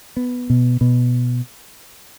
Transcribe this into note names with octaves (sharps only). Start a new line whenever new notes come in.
B3
B2
B2